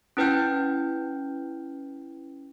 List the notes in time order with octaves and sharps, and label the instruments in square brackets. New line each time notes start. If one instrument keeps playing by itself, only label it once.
[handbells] C#4 E4 B4 G5 F6 G6